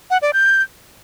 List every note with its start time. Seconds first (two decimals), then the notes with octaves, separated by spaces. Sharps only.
0.10 F#5
0.22 D5
0.33 G6